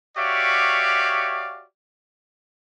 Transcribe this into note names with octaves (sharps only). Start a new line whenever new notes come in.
F#4 G4 C#5 D5 E5 F5